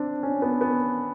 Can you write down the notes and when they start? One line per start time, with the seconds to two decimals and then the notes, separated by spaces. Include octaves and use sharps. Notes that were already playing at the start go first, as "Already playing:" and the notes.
Already playing: C4 D4
0.23 C#4
0.42 B3
0.61 B3